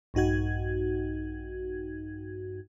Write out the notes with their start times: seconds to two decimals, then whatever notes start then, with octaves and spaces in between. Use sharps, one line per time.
0.14 A#1 G2 D#4 F#4 G#6